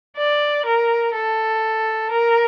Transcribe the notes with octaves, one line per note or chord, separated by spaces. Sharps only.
D5
A#4
A4
A#4